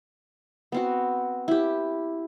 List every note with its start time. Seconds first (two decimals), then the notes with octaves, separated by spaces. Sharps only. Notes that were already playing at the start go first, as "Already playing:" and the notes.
0.72 B3 C4 F#4
1.48 E4 G4